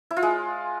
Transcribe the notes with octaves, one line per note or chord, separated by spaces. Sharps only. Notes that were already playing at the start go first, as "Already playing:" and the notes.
E4
F4
G#3